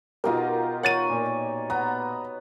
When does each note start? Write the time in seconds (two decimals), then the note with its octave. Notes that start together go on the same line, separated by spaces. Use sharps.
0.24 B2 D#4 F4 G4 A#4
0.83 C#5 F#5 A6 D#7
1.09 A#2
1.70 B3 A#5